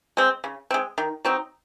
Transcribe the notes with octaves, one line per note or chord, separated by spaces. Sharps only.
G#3 C4
C#3
G#3 C4
D#3
F#3 C4 D#4